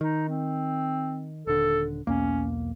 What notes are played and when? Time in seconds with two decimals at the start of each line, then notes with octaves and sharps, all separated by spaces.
0.01 D#3 D#4
0.29 C4
1.47 D#1 D3 A4
2.07 B1 E2 A#3 C#4